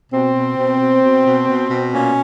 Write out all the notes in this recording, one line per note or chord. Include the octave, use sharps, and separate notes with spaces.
B2 C4
B2
B2
B2
B2
B2
B2
B2
A#2 C#4